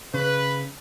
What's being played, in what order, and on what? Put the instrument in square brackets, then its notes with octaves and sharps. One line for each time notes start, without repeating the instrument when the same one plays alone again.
[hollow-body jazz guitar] C#3 [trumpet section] B4